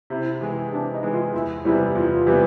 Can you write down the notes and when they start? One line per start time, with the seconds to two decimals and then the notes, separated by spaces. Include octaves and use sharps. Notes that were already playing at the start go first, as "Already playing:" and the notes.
0.10 C3 E4
0.41 E3 G#3
0.72 C3 D4
0.92 D#4
1.03 E3 G#3
1.13 F4
1.33 E2 E4
1.64 C3 E3 G3 B3 E4
1.95 E2 F4
2.26 C3 E3 G3 B3